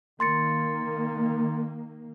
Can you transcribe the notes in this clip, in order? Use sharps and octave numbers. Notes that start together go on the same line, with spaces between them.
D#3 A#3 C6 A6 C#7